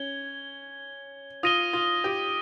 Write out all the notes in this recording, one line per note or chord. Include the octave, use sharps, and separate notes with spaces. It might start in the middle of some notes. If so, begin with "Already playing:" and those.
Already playing: C#4 G#6 G7
F4 D#6 A#6 D#7 G7
F4
G4